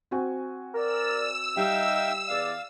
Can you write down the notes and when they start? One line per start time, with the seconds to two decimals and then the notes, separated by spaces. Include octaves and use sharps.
0.11 C4 F#4 G#5
0.74 A#4 D5 E6
1.57 G3 D#4 E5 F5 G5
2.28 E2 D5 F5